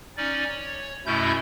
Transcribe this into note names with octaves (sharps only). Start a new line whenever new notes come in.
C#4 D#4 D5
C#5
F#2 B2 A3 C#4 E4 G6